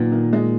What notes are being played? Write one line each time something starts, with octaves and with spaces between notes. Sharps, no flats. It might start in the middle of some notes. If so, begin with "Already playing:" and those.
Already playing: A#2 D#3 F#3 B3
D#3
G#3